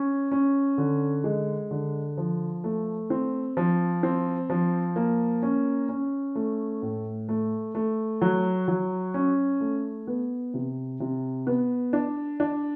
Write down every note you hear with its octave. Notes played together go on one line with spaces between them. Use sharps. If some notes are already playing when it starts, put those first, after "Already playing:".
Already playing: C#4
C#4
D3
G#3
D3
F3
A3
C4
F3
C4
F3
A#3
C#4
C#4
A3
A2
A3
A3
F#3
F#3
C#4
A3
B3
C3
C3
B3
D4
D4